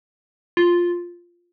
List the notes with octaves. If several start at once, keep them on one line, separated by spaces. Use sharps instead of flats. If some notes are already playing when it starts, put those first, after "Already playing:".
F4